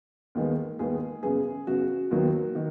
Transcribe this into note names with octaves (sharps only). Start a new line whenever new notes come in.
D#2 D#3 G#3 B3
D#2 D#3 G#3 B3 G#4
F#2 C#3 B3 G#4
F#2 C#3 B3 F#4
D#2 D#3 F#3 B3
D#3